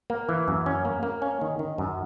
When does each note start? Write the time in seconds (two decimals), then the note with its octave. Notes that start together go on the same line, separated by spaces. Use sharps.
0.10 A#3
0.29 E3
0.48 F#2
0.66 C#4
0.85 A#3
1.03 A#3
1.22 C#4
1.41 D#3
1.59 D#3
1.78 F#2